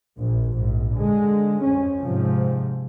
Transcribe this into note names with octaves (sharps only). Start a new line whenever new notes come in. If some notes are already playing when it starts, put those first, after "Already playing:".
A#1
A#1 G#2
D3 G#3
F2 C#4
G#2 C3 F3